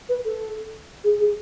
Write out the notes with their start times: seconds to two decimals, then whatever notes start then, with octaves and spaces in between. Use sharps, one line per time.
0.09 B4
0.25 A4
1.04 G#4
1.19 G#4